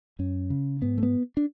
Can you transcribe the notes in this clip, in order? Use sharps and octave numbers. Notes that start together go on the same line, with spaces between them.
F#2 C#4
C#3
G#2 B3
A3
B3
D4